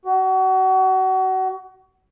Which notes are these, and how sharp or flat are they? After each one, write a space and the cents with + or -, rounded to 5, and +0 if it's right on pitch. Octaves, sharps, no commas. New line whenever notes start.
F#4 +30